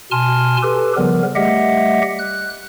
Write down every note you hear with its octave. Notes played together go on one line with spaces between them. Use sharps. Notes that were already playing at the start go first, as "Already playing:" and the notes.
B2 G#5 A5 C6 F6
G4 A4 B4
C#3 F3 G3 B3 A#4
G3 A3 G4 D#5 E5 F#5
F#6